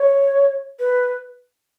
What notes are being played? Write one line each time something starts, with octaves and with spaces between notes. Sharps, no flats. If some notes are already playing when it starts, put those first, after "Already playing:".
Already playing: C#5
B4